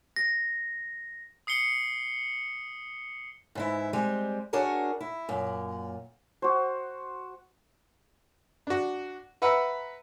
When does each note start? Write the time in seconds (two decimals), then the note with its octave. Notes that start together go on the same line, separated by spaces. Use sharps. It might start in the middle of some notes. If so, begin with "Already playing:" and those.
0.16 A#6
1.47 D#6 C7 C#7 G7
3.55 G#2 E3 E4
3.93 G3 G#3 C4
4.53 D4 F#4 G#4 A#4 C#5
5.01 E4
5.29 F#2 A#2
6.42 F#4 C5
8.67 D4 F#4
9.42 B4 E5 F#5 A#5 B5